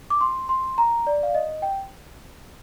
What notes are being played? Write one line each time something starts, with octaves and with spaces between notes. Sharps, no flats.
D6
C6
C6
A#5
D5
F5
D#5
G5